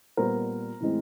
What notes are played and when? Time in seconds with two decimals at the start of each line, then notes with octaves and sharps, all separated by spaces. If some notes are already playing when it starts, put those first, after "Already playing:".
0.17 A#2 G3 B3 A#4 C5
0.80 A2 E3 G#3 C4